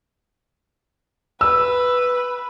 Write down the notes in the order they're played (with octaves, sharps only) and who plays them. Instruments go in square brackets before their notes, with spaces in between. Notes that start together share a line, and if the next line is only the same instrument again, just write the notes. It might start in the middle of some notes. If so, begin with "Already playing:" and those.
[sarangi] B4 [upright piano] E6